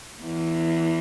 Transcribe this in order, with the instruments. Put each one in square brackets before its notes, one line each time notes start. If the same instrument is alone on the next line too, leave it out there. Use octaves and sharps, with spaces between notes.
[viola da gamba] E2 E3